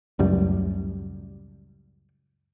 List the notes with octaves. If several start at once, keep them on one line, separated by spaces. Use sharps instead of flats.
C#2 F#2 A2 G3